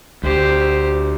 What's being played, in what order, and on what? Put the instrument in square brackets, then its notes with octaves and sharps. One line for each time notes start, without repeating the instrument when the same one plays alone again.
[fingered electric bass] D2 [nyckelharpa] G4 C5